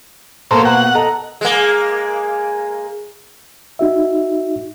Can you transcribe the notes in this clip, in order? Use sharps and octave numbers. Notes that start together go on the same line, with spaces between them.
B2 A#3 A4 A#4 C5
F#5
A4 D#5 A#5
G#3 A#3
D#4 F#4 E5